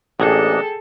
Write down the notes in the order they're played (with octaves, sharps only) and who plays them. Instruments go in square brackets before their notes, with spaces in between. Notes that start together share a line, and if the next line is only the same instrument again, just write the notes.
[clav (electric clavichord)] A1 [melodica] A#3 D4 D#5 [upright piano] G#4 G5 [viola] A4